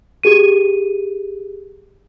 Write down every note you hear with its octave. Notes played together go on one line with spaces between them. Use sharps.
G4 G#4 D#7